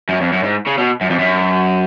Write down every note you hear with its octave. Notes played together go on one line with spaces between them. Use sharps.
F#2
F2
F#2
G#2
C#3
B2
F#2
F2
F#2